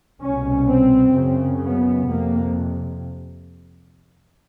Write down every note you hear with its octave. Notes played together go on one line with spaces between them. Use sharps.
C2 B2 C#4
C4
F#2 C#3
B3
F2 C3 A#3